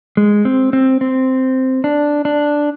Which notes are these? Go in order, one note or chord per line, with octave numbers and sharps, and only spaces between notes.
G#3
C4
C4
C4
D4
D4